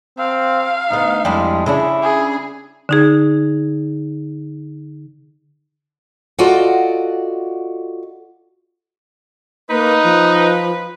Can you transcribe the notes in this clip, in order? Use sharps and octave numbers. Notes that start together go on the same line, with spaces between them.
C4 F5
D2 B3 D#4
F2 G3 G#3 E4
C#3 C#4 D4 E4
G#4
D3 D#4 G#4
F4 F#4 A4 D5 D#5 F#5
A#3 D#4 B4
F3